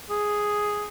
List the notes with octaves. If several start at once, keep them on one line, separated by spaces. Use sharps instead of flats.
G#4